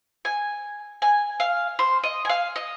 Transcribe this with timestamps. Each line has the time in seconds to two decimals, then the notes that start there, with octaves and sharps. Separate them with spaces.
0.25 G#5
1.02 G#5
1.40 F5
1.79 C5
2.04 D#5
2.25 G#5
2.29 F5
2.56 D#5